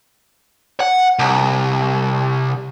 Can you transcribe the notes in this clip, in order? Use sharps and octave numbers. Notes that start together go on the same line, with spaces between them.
F#5
C2